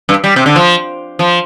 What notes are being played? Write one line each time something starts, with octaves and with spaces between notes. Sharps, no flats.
G2
G3
C3
D3
F3
F3